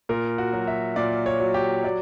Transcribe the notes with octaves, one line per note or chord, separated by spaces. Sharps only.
A#2 A#4
F#4
F#3
E5
A#2 D5
C#5
F#3
G4
F#3 D5